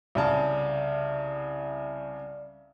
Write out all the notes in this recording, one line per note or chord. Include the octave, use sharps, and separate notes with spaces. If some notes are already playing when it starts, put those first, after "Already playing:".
C2 C#3 D5 A5